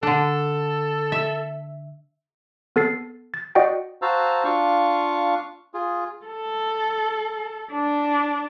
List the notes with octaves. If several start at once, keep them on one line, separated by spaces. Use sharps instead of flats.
D3 D4 A4
E5
B3 A4 A6 C7
A6
F#4 D5 D#5 F#5 G5
F#4 C5 F5 A5 A#5 E6
D4 F4 F5 C#6
F4 G#4
A4
D4